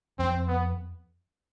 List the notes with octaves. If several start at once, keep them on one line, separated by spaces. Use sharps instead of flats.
F2 C4
B3